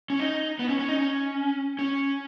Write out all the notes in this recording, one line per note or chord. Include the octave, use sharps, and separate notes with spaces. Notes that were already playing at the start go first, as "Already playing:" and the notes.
C#4
D#4
B3
C#4
C#4
D#4
C#4
C#4